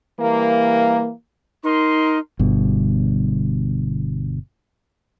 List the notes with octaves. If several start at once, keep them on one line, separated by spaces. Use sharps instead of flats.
E3 G3 A#3
D#4 A#4 C6
G1 G2 B2